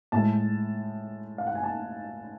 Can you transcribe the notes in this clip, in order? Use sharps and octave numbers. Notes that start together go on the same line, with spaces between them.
A2 G#3 A5
F5
F#5
G#5
A5